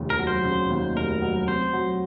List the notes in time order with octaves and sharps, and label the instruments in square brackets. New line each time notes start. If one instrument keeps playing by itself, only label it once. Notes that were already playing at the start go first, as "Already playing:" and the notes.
Already playing: [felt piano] F1 D#2 C#3
[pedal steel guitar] A#4
[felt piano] F#3
[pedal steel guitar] C5
[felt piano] C#3
D#2
[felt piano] F1 [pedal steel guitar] A#4
[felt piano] F#3
[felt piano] C4 [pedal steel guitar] C5
[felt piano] F#3